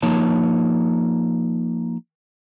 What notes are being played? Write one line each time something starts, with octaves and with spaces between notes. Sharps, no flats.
F3 A#3 D#4 C#5 A5